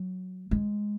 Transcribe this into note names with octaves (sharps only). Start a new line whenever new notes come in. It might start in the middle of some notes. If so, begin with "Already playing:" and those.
Already playing: F#3
G#3